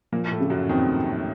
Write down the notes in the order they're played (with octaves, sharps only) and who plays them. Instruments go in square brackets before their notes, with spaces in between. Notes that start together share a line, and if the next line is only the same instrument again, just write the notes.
[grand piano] A#2 A#3 [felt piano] F3
[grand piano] A2 A3
[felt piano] C#3
[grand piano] F#2 F#3
[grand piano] D#2 D#3 [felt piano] C4